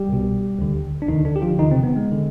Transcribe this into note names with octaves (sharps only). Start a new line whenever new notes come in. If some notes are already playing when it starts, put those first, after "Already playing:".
Already playing: G3 G4
C2 B2
D2 D3
D4
D2 D3 D#3 D#4
D3 D4
G4
F3 F4
D#2 D3 D#3 D#4
C3 C4
B3
G#3
D3